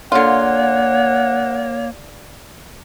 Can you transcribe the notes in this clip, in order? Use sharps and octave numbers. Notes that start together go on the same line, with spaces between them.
D3 A#3 F4 C#5 F#5